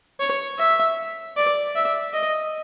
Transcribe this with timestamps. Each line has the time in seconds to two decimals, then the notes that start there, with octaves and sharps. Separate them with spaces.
0.20 C#5
0.58 E5
1.36 D5
1.76 E5
2.14 D#5